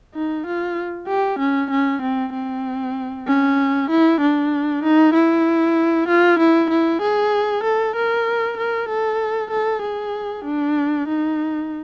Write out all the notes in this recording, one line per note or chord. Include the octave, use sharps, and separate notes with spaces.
D#4
F4
G4
C#4
C#4
C4
C4
C#4
E4
D4
D#4
E4
F4
E4
E4
G#4
A4
A#4
A#4
A4
A4
G#4
D4
D#4